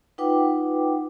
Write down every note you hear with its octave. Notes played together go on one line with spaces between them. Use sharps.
D#4 F4 B4 F#5 G5 D6